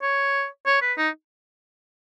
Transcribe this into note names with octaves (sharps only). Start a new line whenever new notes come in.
C#5
C#5
B4
D#4